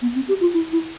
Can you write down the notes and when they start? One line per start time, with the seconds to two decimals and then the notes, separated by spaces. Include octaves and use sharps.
0.02 B3
0.15 C4
0.29 G4
0.41 F4
0.54 E4
0.73 E4